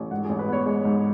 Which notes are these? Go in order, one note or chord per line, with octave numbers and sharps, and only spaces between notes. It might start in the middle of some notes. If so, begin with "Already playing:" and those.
Already playing: A1
G#2 F#5
G#4
A1
B4
B3 C#5
G#3
G#2